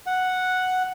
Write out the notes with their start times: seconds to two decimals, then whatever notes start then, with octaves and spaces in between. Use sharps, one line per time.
0.06 F#5